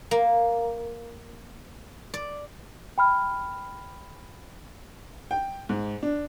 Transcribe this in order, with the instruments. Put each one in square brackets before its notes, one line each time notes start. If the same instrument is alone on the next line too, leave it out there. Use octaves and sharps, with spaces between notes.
[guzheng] A#3
D5
[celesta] G5 B5 F6
[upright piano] G5
G#2
D4